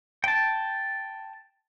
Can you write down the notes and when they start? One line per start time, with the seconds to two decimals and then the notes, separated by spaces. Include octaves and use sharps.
0.24 G5 A5